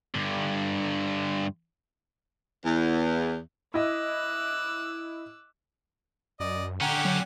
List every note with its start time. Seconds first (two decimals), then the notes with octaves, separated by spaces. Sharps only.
0.15 G2 D3
2.66 E2
3.74 E4 D#5 D6 E6 F#6
6.40 F#2 D5 D#5
6.81 D3 C#4 G4 F#5 G5 A#5
7.05 F#3